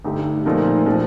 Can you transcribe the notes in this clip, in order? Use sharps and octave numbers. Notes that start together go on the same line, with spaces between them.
G2 D3 A3 D#4 G4
A#2 F3 A3 D#4 A#4
F3